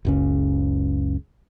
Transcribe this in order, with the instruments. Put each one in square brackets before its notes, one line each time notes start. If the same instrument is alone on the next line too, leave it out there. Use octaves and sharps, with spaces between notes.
[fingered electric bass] F#1 C#2 C#3